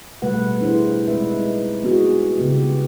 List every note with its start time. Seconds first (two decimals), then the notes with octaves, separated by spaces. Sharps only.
0.22 B2 G3 A3 B4 F#5
0.61 D4 E4 G#4 C5
1.08 G#3 C4 B4 E5
1.24 D#4
1.83 B3 C4 E4 F#4 G#4
2.38 C#3 B3 G4